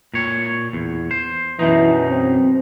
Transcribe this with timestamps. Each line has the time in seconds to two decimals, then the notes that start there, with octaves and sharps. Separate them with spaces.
0.14 A#2 C#5
0.73 E2
1.11 C5
1.59 F#2 B2 E3 D#4
2.10 C4